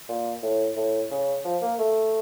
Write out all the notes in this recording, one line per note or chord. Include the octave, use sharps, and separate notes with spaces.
A#2
A2
A2
C#3
F3
A#3
A3